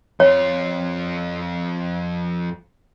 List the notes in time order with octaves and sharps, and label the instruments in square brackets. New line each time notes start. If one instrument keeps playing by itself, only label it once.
[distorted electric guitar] F2 F4 [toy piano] C#5